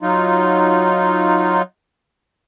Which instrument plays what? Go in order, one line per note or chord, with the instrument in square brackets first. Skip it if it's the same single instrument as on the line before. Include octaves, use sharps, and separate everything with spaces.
[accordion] F#3 D#4 F4